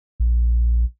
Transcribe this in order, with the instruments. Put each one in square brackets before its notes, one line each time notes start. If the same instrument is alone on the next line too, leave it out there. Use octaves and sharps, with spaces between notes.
[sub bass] A#1